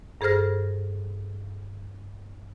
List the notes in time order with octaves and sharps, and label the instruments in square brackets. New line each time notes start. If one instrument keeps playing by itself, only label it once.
[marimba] G2 G#4 A4 C5 F6 A#6